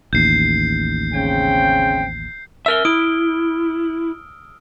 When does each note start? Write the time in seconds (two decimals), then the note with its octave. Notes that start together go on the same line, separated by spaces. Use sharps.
0.13 A1 D#2 G6 C7
1.13 C#3 C4 G5
2.66 A#4 E5 E6 F6 G7
2.85 E4 D#6 D7